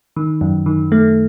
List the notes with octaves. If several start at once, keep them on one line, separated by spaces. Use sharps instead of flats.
D#3
F#2
D#3
A3